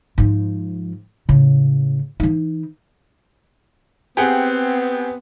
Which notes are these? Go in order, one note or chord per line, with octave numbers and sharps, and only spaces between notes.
G#2 F3
A2 C#3
E3 D#4
B3 C4 G4 G#4 F#5